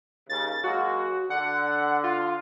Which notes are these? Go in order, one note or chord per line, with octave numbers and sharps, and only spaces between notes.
D#2 C#3 A6
F#3 G#3 A#3 F#4
D3 F#5
F4